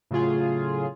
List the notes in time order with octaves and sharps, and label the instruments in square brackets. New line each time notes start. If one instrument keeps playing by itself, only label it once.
[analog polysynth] A2 C#3 F#3 F4 G#4